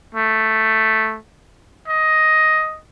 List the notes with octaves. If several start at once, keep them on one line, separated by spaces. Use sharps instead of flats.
A3
D#5